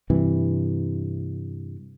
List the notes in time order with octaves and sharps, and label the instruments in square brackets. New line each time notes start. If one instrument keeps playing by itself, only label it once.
[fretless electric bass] G2 C3 E3